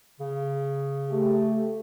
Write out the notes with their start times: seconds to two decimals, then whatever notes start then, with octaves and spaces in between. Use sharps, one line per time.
0.20 C#3
1.11 A3 G4